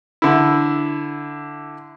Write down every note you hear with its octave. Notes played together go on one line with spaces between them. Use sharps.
D3 E4